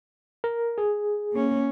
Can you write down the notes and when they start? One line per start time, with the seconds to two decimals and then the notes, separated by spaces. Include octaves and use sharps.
0.44 A#4
0.78 G#4
1.32 A#3 C#4